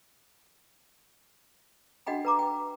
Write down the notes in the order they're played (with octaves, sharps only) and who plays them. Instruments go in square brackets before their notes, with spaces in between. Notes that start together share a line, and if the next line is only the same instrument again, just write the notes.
[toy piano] D4 F#4 D#5 F#5 G5 B5
B4 A#5 D6
G5